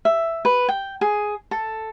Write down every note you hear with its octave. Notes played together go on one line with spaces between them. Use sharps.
E5
B4
G5
G#4
A4